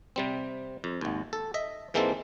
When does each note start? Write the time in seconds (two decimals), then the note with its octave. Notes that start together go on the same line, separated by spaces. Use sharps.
0.16 C3 G3 C4
0.84 F2
1.01 G#1 D#2
1.33 A4
1.54 D#5 E5
1.94 G#2 E3 G#3 A#3 C4 A4